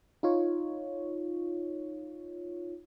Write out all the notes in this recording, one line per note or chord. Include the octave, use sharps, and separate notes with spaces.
D#4 F4 C#5